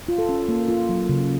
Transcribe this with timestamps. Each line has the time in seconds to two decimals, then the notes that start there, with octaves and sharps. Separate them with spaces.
0.08 F4
0.18 A4
0.29 C#4
0.49 A#3
0.68 F4
0.89 F#3
1.09 C#3